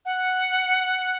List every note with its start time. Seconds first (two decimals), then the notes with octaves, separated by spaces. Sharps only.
0.05 F#5